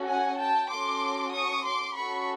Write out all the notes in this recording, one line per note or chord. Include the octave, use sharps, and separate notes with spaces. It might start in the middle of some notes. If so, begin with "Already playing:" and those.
Already playing: C#4 F#4 A4
F#5 G#5
G5 A5
C#4 F#4 A4 C6 D6
C#6 D#6
C6 D6
C#4 F#4 A4 B5 C#6